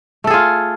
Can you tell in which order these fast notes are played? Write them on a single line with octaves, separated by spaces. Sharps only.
A3 A4 G#4 F4